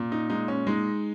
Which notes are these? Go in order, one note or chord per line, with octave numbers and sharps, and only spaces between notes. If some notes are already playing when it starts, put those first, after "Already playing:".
Already playing: A#2
D#4
G#3 D#4
C#4
G#3 D#4